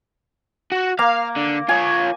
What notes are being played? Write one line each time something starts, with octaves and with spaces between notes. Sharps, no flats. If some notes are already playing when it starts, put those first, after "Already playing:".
F#4
A#3 F5 A#5
D3
F4 C#5 G#5